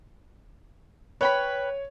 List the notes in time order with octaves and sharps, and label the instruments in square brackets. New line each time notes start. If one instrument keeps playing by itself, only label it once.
[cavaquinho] B4 G5 B5 [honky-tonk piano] C#5